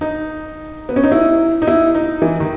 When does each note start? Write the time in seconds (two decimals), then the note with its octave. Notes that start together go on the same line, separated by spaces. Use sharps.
0.01 D#4
0.89 B3
0.96 C#4
1.04 D#4
1.12 E4
1.62 D#4
1.67 E4
1.95 D#4
2.22 E3
2.40 D#3